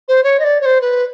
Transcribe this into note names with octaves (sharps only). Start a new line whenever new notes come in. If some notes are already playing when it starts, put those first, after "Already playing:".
C5
C#5
D#5
D5
C#5
C5
B4